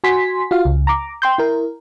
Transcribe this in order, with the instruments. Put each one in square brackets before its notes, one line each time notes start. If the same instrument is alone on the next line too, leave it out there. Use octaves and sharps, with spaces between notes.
[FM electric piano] F#4 G#5 C6 B6
F4 F#4 F5
C#2
A#5 D6
G5 C6 G6
E4 A#4